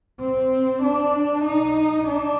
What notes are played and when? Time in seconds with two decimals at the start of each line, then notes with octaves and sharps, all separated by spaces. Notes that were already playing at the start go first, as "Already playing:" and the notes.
0.20 C4
0.83 D4
1.45 D#4
2.08 D4